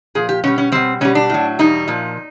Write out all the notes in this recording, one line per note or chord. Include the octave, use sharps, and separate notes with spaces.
A#2 F3 G#4
G4
B2 G3 C#4
C#4
B2 G3 C4
B2 G3 C#4
D4
A2 F#3
E2 B2 G3 D#4
A#2 F3